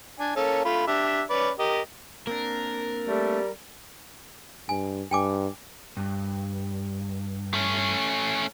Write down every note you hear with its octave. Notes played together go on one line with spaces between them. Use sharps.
D4 G#5
A#3 C#4 A4
A3 F4 B5
D4 G4 E5
C#4 B4 D5
G4 A#4 D#5
A#3 C4 D4 A#4
G3 A3
G2 G#5
G2 G5 G#5 D6
G2
A3 C#4